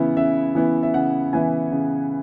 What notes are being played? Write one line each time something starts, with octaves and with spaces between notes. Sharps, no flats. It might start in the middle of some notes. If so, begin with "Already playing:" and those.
Already playing: C#3 E3 B3 E4
C#3 E5
E3 B3 E4
E5
C#3 F#5
E3 B3 E4 G#5
C#3